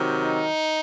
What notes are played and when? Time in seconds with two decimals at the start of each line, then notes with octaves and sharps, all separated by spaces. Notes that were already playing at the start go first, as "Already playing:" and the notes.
Already playing: C3 D#3 F#3
0.24 D#4